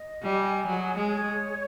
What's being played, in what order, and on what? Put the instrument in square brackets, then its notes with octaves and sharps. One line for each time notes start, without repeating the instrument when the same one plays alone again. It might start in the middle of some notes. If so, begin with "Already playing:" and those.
Already playing: [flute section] D#5
[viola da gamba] G3 [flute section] G#5
[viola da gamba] F#3 [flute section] G#4
[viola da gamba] G#3
[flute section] C#5